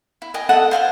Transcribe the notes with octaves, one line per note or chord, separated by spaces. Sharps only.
E4
D#5 G5 G#5
A4 D#5 E5 F#5
C5 F5 G5 G#5